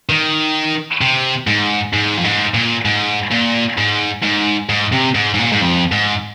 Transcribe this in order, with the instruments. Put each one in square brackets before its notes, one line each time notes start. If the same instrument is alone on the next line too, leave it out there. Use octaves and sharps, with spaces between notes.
[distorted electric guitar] D#3
C3
G#2
G#2
F2
G#2
A#2
G#2
A#2
G#2
G#2
G#2
C3
G#2
G#2
A#2
G#2
F2
G#2